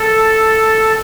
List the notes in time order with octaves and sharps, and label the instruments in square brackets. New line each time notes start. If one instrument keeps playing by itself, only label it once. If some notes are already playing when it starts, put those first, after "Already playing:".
Already playing: [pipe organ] A4